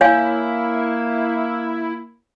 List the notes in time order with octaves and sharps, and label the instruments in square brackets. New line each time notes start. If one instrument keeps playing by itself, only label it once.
[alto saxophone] A#3 [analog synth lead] E4 [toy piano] C#5 F5 G#5